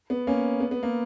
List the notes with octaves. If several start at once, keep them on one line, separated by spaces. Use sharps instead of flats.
B3
A#3 C#4
B3
B3
A#3